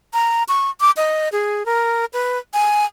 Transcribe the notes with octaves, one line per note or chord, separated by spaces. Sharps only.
A#5
C#6
D6
D#5
G#4
A#4
B4
G#5